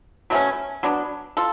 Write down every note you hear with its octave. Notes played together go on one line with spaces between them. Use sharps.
B2 F#3 A3 C#4
F#3 B3 D4
F4 A4